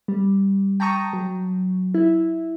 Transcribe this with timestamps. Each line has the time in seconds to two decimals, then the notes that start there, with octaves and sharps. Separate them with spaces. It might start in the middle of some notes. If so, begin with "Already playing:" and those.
0.08 G3
0.80 G5 A5 A#5 C#6 D#6
1.13 F#3
1.94 E4